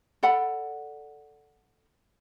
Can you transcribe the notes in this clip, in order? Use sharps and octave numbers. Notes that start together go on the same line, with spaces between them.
A4 D5 F#5 B5